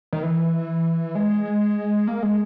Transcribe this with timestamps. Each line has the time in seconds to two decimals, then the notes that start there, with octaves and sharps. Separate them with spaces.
0.13 D#3
0.23 E3
1.15 G#3
2.07 A#3
2.23 G#3